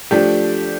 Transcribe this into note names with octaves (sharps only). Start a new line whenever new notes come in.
F3 A3 D4 G4